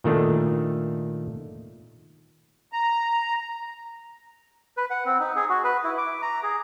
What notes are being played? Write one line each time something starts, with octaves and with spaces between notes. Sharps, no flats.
A#2 D#3 A3 D4
A#5
B4
F#5
C4
D#4
G#4
F#4
B4
E4
D6
A#5
G#4